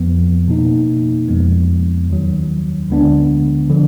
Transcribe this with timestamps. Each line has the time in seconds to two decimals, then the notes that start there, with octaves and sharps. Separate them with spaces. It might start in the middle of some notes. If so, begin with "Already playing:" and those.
Already playing: F2 F3 B3
0.48 B2 A#3 D#4
1.28 F2 F3 G#3 B3
2.08 D#2 D#3 F#3
2.88 D2 D3 G#3 B3 D4
3.69 D3 F3